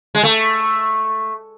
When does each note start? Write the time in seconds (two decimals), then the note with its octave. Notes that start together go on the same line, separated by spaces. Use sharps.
0.15 G#3
0.23 A3